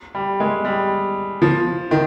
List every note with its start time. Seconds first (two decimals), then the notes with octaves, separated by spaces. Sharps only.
0.15 G3
0.40 G#3
0.65 G3
1.42 F3
1.91 D#3